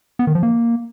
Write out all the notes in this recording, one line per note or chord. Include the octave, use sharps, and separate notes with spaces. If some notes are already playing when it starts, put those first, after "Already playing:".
B3
D#3
F3
A#3